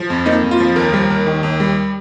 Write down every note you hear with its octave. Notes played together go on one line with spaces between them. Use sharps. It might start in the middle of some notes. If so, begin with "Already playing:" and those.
Already playing: F3
F2
A#3 D#4
F2
F4
F3
D#2 A#4
G3
D#2
D#3
D#2
G3